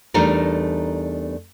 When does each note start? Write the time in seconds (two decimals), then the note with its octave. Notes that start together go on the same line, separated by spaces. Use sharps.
0.14 E2 G3 A3 D4 D#4 A#4